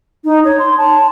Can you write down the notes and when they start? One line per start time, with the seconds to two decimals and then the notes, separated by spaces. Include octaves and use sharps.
0.24 D#4
0.45 C#5
0.59 C6
0.78 A5